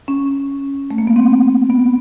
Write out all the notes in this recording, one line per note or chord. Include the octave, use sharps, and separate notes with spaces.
C#4
A3
A#3
B3
C4
B3